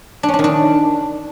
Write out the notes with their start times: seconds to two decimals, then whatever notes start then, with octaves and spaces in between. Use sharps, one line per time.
0.23 D4
0.28 C#4
0.34 D4
0.39 D#3
0.44 D4